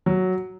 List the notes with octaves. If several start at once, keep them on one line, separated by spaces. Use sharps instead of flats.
F#3